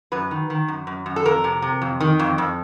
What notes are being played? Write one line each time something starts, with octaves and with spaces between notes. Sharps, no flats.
F#2 B4
D#3
D#3
F#2
F#2
F#2
A4
F2 A#4
C3
C3
F2
D#3
F2
F2